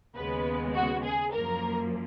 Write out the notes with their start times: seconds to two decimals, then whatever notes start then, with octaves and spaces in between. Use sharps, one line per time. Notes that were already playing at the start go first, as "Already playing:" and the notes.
0.15 D#2 C#3 G#3 B3 B4
0.75 F#4
1.04 G#4
1.33 F#2 F3 A#3 A#4